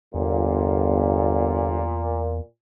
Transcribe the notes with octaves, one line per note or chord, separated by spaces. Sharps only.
G1 E2 A#2